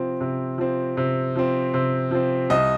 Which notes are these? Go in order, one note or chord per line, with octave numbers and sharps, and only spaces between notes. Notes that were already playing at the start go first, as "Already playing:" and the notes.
Already playing: C3 F3 C4
C3
F3 C4
C3
F3 C4
C3
F3 C4
C2 D#5